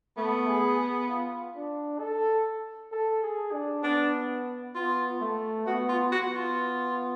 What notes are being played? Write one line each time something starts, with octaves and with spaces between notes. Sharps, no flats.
A3 B3
G#4
F4
D4
A4
A4
G#4
D4
B3 D4
B3 F4
A3
B3 F#4
F4
B3 F#4
F4